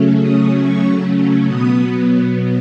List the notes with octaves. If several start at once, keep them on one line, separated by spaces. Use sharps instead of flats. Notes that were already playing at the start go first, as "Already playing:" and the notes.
Already playing: C#3 F#3 A3 C#4
D#6
C#6
B2 F#3 B3 D#6